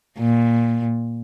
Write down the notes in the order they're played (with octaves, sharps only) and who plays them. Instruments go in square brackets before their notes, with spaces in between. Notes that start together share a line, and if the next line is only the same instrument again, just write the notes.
[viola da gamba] A#2